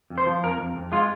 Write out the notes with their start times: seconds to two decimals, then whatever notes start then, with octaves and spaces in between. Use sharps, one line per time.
0.10 F2
0.18 C5
0.26 F3
0.43 F2 A#4
0.59 F2
0.76 F2
0.92 G#3 F4